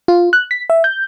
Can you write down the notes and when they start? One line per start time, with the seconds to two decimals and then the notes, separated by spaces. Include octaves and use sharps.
0.08 F4
0.33 F#6
0.51 B6
0.70 E5
0.84 G6